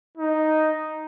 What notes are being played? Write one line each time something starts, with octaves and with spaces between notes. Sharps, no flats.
D#4